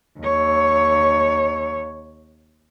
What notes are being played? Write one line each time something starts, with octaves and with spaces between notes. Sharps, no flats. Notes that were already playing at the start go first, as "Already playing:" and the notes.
D#2 C#5